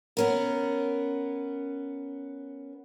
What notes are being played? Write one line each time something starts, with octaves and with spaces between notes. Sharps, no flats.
B3 C#4 A#4